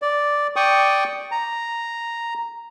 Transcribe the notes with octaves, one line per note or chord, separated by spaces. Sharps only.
D5
D5 G5 C#6 D#6
A#5